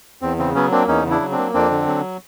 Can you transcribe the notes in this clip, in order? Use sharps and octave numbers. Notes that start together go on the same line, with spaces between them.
E2 C4
C#3 C4
F#3 B3 C#4
A#3 C4 D4
E2 C#4 D#4
C#3
D4 E4
F#3
C4 D4
A#3
F2 C4 D4
D3
F#3